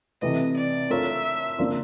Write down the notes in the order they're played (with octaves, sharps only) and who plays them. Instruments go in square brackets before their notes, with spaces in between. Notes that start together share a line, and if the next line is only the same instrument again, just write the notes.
[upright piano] C3 E3 A3 [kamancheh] D#5
[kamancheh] D5
[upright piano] A3 D4 F4 A#4 C#5 [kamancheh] E5
[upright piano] C#3 F3 A#3 D4 F4